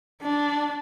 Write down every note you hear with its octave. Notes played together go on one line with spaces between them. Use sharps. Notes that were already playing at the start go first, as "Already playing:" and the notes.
D4